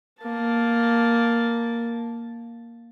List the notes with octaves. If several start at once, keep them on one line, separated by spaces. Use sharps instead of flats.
A#3 A5